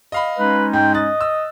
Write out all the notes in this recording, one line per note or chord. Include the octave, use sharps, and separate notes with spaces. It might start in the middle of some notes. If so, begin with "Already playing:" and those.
D#5 F5 B5
G#3 C#4 D#4 B4
G#2 G5
D#5 F#6 A6
E6